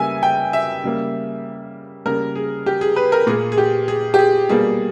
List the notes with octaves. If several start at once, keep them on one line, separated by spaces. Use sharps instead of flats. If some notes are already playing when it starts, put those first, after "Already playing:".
Already playing: C#3 G3 A#3 E5 G#5
G5
E5
C#3 G3 A#3
C#3 G3 A#3 A#4
G#4
G4
G#4
B4
A#4
A#2 A#3 G#4
G#4
G4
G#4
G4
G#4
B2 G3 A#3 G#4